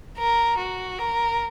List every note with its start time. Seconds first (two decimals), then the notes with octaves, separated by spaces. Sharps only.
0.18 A#4
0.58 F#4
0.99 A#4